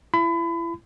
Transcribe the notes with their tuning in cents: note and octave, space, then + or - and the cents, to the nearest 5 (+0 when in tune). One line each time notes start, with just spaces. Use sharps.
E4 +35 B5 +30